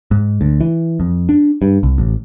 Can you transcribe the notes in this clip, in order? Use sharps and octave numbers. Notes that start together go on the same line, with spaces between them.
G#2
D2
E3
F2
D4
G2
C2
A1